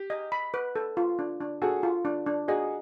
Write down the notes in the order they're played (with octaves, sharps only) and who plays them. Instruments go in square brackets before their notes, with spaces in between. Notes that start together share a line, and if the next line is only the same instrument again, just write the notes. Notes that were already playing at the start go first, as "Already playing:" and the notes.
Already playing: [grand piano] G4
[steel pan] D#5
B5
B4
A4
F4
D4
D4
[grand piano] F#4 G#4 [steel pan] A4
[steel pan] F4
D4
D4
[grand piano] F#4 G#4 [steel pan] D#5